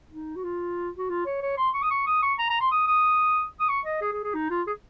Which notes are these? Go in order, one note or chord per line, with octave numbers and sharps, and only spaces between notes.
D#4
F#4
F4
F#4
F4
C#5
C#5
C6
C#6
D#6
C#6
D#6
C#6
A#5
A#5
C6
D#6
D#6
D#6
C#6
D#5
G#4
G#4
G#4
D#4
F4
G#4